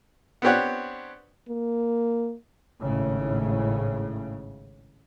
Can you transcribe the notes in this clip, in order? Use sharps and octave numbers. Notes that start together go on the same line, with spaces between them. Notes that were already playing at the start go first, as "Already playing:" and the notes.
B3 C4 D4 G4 C#5 F#5
A#3
G#1 A2 C#3